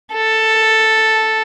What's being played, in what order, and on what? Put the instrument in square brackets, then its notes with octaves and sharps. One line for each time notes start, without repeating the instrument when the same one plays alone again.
[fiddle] A4